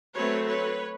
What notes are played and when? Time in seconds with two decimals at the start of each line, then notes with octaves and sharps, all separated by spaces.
0.15 F#3 A3 C4 B4 C#5
0.47 B4 C#5